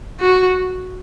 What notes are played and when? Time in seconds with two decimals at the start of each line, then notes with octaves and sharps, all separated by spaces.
0.20 F#4